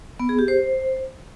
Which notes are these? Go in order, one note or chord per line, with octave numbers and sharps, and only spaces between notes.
B3
G#4
G4
C5